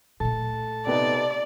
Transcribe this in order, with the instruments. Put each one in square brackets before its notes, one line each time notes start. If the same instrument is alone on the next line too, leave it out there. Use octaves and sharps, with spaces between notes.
[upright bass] A#2 A3 [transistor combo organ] A4 A5
[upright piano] C3 B3 D#4 [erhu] D5